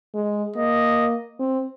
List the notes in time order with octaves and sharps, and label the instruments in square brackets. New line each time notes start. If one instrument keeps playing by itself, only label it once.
[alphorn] G#3
[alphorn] A#3 [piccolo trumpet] D#5
[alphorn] C4